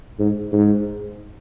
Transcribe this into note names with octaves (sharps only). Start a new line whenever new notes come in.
G#2
G#2